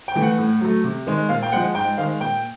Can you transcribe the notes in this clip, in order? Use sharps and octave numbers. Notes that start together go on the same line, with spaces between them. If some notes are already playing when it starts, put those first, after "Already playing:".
G5
E3 A3
F#5
A2
F#3 A3
C3
D#3 G#3
A#2 F5
G5
F3 G#3 F#5
G#2 G5
D#3 G#3 F5
A#2 G5